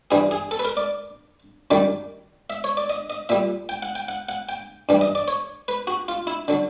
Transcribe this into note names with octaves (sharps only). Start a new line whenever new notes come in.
G2 E3 G3 G#4
G#4
A4
B4
A#4
D5
F#2 D#3 G3 D5
E5
C#5
D5
D#5
D#5
A#2 G3 E5
G5
F#5
G5
F#5
F#5
G5
G2 E3 G3
D#5
D5
C#5
B4
F#4
F4
E4
D3 F#3